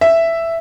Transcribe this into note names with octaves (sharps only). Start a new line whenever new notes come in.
E5